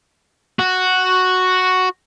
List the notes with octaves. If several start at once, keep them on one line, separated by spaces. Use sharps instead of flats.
F#4